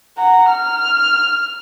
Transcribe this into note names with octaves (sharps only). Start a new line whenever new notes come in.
F#5 A#5
F6